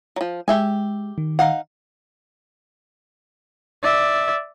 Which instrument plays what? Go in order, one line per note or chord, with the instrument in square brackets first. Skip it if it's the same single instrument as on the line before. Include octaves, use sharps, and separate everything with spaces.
[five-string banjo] F3 F#3
[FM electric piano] G#3 [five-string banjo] G4 E5 G#5
[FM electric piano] D#3
[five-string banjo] D#4 F5 F#5
[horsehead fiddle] D5 E5